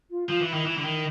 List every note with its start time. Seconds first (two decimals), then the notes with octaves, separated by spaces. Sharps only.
0.10 F4
0.28 F3 F4
0.41 E3
0.47 E4
0.53 D#3
0.66 E3 E4
0.77 D3
0.84 D#3